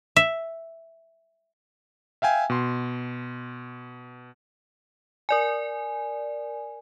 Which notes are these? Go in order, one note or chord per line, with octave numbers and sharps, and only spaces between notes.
E5
E5 F5 G5 G#5
B2 C6
A#4 D5 G#5